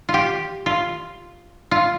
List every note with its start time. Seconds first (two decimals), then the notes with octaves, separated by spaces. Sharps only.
0.09 F4
0.14 G4
0.66 F4
1.71 F4